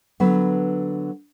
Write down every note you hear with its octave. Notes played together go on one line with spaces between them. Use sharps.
D3 F#3 B3 B4